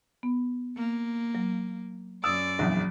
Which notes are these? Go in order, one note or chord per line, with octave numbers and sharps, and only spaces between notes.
B3
A#3
F#3
F#2 D5 D#6 E6
A#1 E2 F#3